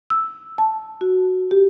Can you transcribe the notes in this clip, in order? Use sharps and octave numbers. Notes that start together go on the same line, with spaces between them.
E6
A5
F#4
G4